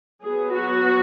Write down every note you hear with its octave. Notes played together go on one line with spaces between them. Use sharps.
F#3 B3 G#4
F#4